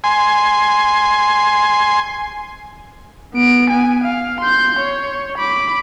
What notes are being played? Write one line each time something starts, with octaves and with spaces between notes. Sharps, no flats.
G#5 C6
B3 D7
B3 G#5
F5
C6 G6
C#5
B5 D6